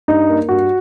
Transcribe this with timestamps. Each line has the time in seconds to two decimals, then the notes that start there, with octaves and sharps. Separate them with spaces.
0.08 G2 D#4
0.28 A#3
0.49 G2 F#4